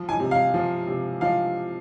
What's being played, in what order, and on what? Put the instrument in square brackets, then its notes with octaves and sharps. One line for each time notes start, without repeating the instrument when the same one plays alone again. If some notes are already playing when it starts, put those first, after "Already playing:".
Already playing: [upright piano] F3
G#5
C3
F5
F3
C3
F3 F5